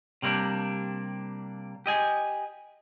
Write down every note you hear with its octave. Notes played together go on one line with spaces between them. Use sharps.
C3 G3 A#3 C4 D4
G4 D#5 G#5